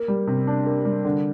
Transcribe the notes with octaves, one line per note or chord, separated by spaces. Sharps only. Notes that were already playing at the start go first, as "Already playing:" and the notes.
Already playing: A#3
G3
C3
D4
A#3
G3
D3